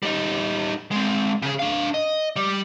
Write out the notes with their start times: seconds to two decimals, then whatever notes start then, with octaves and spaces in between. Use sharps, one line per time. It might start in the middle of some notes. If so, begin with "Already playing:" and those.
0.03 G3 D#4
0.91 G#3 C4
1.42 C#3 G#4
1.59 D4 F5
1.94 D#5
2.36 G3